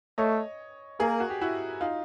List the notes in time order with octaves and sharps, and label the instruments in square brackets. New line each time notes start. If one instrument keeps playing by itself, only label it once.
[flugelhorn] A3 [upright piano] C#5 D#5
[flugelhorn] A#3 [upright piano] G#4 A#4
[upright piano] F#4
G4
E4 F#4
D#4 F4